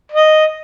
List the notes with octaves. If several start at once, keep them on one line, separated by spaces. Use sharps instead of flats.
D#5